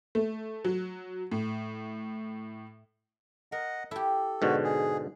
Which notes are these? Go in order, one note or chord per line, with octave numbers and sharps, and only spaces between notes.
A3
F#3
A2
A#4 D#5 F#5
E4 G4 A4
G#2 B2 D3 F#4
G#4